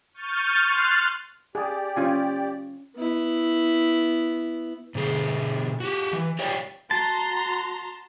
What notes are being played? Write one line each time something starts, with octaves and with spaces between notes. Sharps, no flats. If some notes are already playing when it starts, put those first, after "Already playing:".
C#6 F6 G6 A6 D#7
C6 F6 F#6 A6
G4 G#4 D5
C#4 F4 G#5
B3 E4
B2 D3 G#4
F#4 G4
E3
G4 C#5 D5 F5 G5
F#4 A5 A#5 C6